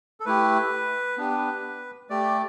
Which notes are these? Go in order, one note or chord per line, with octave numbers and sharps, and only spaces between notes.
A4
A3 E4 G4 B4
B3 D4 G4
A3 G4 D5